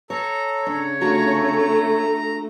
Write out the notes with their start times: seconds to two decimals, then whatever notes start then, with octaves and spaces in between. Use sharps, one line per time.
0.10 A4 C#5 A#5
0.67 C#3 D4 C#5
1.01 A3 D4 F4 F#4 A#5